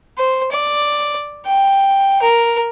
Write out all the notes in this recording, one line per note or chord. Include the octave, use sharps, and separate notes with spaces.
C5
D5
G5
A#4